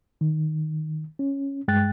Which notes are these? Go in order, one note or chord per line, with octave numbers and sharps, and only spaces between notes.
D#3
C#4
G2 G#3 G5 F#6 A6